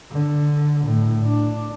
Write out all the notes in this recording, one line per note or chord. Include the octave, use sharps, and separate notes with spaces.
D3
A2
D4